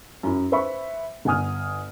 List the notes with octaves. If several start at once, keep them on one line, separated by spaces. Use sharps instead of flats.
F#2 E4
B4 C5 E5 B5 C#6
G1 F#5 G#5 D#6 F6